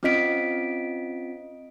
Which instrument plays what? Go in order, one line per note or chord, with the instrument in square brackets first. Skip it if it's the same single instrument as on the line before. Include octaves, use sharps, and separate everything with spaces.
[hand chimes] C4 C#4 F4 D#5 B6 D7